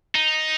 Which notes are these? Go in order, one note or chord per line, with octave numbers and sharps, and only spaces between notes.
D#4